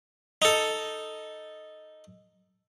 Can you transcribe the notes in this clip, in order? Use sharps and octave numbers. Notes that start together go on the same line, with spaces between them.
D#4 A4